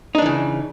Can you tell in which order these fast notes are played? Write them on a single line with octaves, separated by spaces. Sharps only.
D#4 D4 E3 C#3